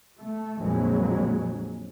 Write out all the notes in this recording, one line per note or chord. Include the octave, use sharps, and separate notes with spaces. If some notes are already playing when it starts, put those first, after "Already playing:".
A3
A#1 F2 D3 F#3 G#3